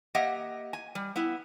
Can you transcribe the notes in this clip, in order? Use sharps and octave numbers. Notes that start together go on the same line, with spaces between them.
A#3 G4 D#5 E5 F#5
G#5
G3
B3 E4